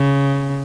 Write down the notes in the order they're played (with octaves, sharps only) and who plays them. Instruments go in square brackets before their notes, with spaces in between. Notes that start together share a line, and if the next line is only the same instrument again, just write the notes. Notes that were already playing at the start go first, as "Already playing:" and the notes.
Already playing: [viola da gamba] C#3